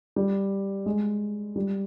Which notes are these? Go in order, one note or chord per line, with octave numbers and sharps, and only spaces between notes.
G3
G#3
G3